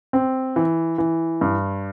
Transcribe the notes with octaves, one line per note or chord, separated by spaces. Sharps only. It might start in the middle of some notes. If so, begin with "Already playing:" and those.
C4
E3
E3
G2